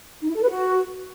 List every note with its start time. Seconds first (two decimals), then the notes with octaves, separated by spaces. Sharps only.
0.22 D#4
0.29 E4
0.35 A4
0.42 B4
0.49 F#4